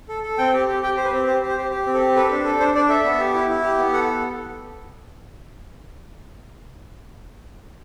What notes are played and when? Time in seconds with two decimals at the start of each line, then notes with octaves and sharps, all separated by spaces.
0.09 A4
0.23 A4
0.38 C4 G5
0.54 G4
0.68 G4
0.83 G4 G5
0.97 G4 C5
1.05 B4
1.12 C4
1.27 G4 C5
1.42 G4
1.49 C5
1.57 G4
1.71 G4
1.86 C4
1.94 A4
2.00 G4
2.16 A4 B4
2.30 D4
2.45 A4
2.60 D4 C5
2.74 D4 D5
2.89 A4 E5
3.04 B3
3.19 G4
3.34 E4
3.49 E4
3.64 G4
3.78 B3
3.93 A4 F#5